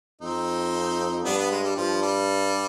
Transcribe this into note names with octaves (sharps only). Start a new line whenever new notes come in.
F2 C4 D#4
G2 B3 D4
B3
G#3
G3
G2 F3
G3